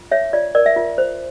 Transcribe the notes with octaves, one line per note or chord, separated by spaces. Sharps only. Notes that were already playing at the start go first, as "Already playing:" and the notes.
Already playing: F4
C#5 E5
F4 D5
A#4 D5
E5
F4
C5